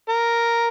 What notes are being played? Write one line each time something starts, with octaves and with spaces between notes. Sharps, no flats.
A#4